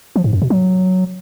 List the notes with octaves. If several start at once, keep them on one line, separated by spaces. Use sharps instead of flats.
F3
G#2
F#2
B2
F#3